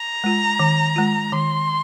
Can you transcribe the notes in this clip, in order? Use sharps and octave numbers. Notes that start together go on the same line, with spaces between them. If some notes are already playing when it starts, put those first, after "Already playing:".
Already playing: A#5
G#3 F4
D#3
G#3 F4
D#3 C6